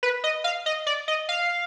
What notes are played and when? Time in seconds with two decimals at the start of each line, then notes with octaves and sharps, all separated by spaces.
0.03 B4
0.24 D#5
0.44 F5
0.66 D#5
0.87 D5
1.08 D#5
1.29 F5